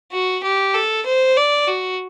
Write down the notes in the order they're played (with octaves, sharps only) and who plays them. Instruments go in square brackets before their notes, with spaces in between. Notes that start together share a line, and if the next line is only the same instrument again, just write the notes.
[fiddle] F#4
G4
A4
C5
D5
F#4